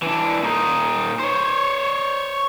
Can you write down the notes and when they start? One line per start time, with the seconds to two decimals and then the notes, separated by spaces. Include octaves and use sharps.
0.03 E3 D4
0.44 A#2 D#4
1.19 C5 C#5